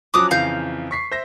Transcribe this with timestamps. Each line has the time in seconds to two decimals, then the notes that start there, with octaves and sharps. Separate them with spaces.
0.14 F3 F#3 C#4 D6 D#6 F#6
0.31 F2 C#3 E3 F5 A#5 G6
0.91 C#6 B6 C7
1.12 C5 E5 A#6